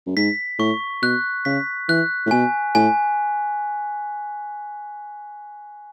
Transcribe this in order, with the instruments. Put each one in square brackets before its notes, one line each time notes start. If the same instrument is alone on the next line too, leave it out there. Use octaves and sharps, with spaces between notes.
[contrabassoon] F#2
[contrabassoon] G#2 [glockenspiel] B6
[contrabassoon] A2 [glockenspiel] C#6
[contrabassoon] B2 [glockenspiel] F#6
[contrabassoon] C#3 [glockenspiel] B6
[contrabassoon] E3 [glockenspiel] F#6
[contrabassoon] A2
[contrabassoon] B2 [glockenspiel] G#5
[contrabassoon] A2 [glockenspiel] G#5